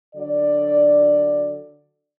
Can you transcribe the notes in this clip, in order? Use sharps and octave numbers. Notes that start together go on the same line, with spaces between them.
D3 F#3 D5